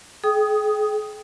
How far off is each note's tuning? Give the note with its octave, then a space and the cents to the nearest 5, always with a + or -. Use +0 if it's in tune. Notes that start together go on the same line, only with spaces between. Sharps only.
G#4 +35 G5 +0 D#6 +0